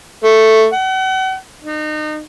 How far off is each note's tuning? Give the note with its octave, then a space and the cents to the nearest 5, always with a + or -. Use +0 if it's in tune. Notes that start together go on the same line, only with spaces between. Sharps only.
A3 +5
F#5 +40
D#4 -30